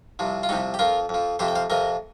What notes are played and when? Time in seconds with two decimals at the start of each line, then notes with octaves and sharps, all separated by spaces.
0.19 C2 C3 F3
0.43 F4
0.49 C2 C3 F3 D#4 G4
0.74 G4
0.79 F2 F3 F4 A#4
1.09 F2 F3
1.39 F2 C3 F3 G4 C5
1.48 G5
1.55 C5 F5
1.70 F2 C3 F3 A#4 D#5